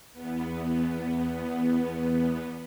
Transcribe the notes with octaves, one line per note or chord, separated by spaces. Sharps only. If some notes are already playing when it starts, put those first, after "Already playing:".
E2 B3